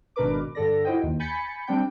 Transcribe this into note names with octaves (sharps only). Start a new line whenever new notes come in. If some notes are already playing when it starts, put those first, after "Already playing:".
G#1 B2 D4 A#4 B4 D6
G2 D3 A4 D5 A#6
E4 F#4 C5 D#5 G5
D#2 D#3
G#5 B5 G6 A6 B6 C#7
G3 C4 D4 G5 G6